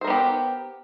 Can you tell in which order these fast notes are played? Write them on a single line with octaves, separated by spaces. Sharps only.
C5 A#4 B3 G4